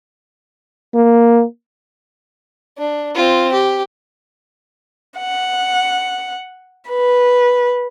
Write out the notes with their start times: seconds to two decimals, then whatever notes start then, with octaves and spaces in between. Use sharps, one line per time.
0.95 A#3
2.79 D4
3.15 C4 F4
3.53 G4
5.19 F#5
6.89 B4